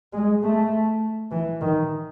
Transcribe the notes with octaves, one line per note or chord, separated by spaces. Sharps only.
G#3
A3
E3
D#3